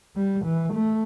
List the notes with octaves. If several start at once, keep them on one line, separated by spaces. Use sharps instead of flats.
G3
E3
A3